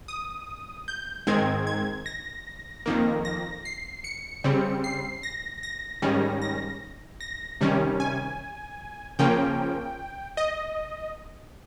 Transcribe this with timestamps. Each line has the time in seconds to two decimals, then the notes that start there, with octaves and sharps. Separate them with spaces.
0.08 D#6
0.88 G6
1.27 G#2 D#3 G#3 C4 G#6
1.67 G#6
2.06 A#6
2.86 F2 D#3 A#3
3.25 A#6
3.65 C7
4.04 C#7
4.44 C#3 G3 C4
4.84 C7
5.23 A#6
5.63 A#6
6.02 G#2 D#3 G3 C#4
6.42 A#6
7.21 A#6
7.61 C3 D#3 G3 C#4
8.00 G#5
9.19 C#3 F3 A#3 C#4 G5
10.37 D#5